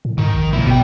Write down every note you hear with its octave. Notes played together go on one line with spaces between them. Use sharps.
A2
G#2 D#3
A#1
A#2 A#3 E4
G#1 B2 G3 G5